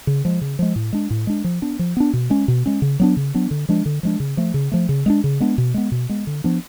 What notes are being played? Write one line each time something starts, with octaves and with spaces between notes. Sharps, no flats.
C#3
F3 G#3
C#3
F3 G#3
A2
G#3 D4
A2
G#3 D4
F3
B3 D4
F3
B3 D4
B2
G#3 C#4
B2
G#3 C#4
C#3
F#3 B3 D4
C#3
F#3 B3 D4
D3
F3 G#3 D4
D3
F3 G#3 D4
C#3
F3 A3
C#3
F3 A3
C#3
G#3 B3 D4
C#3
G#3 B3 D4
B2
G#3 B3
B2
G#3 B3
D3
F3 B3 D4